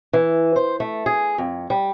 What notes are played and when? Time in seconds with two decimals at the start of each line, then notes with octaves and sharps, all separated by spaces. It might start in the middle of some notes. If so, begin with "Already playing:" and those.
0.13 E3
0.56 C5
0.80 A3
1.06 G#4
1.38 F2
1.70 G3